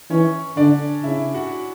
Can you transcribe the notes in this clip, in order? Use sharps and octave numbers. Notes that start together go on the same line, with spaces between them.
E3 C#4 C#5
D3 D4 D5
C#3 E4 E5
F#4 F#5